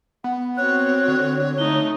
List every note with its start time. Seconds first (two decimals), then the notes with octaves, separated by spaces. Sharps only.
0.24 B3 F#5
0.57 C4 F#4 C#5 F#6
1.08 D3
1.58 A3 D#4 G7